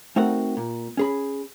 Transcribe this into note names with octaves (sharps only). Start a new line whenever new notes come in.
A3 C4 D#4 F#4 A#4 F#5
A#2
C#4 G#4 B5